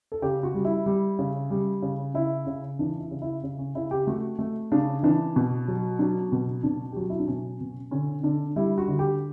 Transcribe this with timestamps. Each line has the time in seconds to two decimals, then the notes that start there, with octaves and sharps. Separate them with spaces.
0.12 A4
0.22 C#3 G4
0.43 F#4
0.54 G3
0.65 E4
0.86 G3
1.19 C#3
1.50 G3
1.82 C#3
2.14 C#3 E4
2.46 C#3
2.79 E3 D4
3.00 E4
3.11 C#3
3.22 E4
3.43 C#3
3.59 C#4
3.75 C#3 E4
3.91 G4
4.07 A3 F#4
4.39 A3
4.72 C#3 D4
5.03 E3 D4
5.36 B2
5.68 F#3
5.99 F#3 D4
6.32 B2
6.63 B2 D4
6.92 G4
6.96 F#3 F#4
7.10 E4
7.19 D4
7.28 B2 C#4
7.60 B2
7.91 D3 C#4
8.23 D3 D4
8.56 G3 E4
8.78 F#4
8.88 D3
8.99 G4